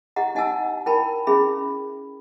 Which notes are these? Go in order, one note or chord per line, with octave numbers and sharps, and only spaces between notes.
E4 G4 D#5 F#5 A#5
D#4 D#5 F#5 G#5 A5 E6
E4 A#4 G5 A5 B5
C#4 E4 G#4 E5 B5